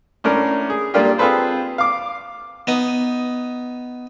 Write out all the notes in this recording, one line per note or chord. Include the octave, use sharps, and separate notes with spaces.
A2 C#4 D4 A#4
G#4
A#2 G3 A#3 D4 F4 G4
C4 F4 G#4 A4 B4 C5
F5 D6
B3 D#4 D#6